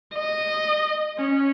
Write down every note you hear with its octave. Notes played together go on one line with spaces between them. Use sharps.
D#5
C#4